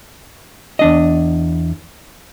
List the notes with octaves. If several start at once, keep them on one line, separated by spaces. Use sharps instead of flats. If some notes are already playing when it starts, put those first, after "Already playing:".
E2 D4 D#5